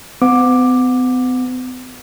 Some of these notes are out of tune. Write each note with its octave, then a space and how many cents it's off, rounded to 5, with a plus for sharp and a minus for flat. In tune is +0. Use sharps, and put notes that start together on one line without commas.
B3 +45 F#5 -30 D6 +10